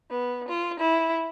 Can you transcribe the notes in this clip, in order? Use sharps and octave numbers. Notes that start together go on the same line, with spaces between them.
B3
F4
E4